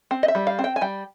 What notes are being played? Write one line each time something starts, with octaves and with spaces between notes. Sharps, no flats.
C4
D#5
E5
G3
F5
C4
G5
G#5
G3 G5